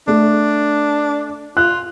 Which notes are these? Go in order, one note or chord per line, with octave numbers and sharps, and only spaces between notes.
A3 D4
F4 F#6